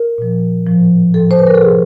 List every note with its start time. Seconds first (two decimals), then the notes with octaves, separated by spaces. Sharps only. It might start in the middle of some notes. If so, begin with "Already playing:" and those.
Already playing: A#4
0.18 A#2 F3
0.66 A2 F3
1.14 A2 F3 A4
1.31 C5
1.39 B4
1.47 A#4
1.55 A4
1.62 C3 F3 G#4